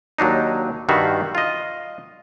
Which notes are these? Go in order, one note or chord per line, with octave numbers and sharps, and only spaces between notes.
D#2 F#3 D4 D#4
G2 D#3 G3 F#4 E5 F5
F4 D#5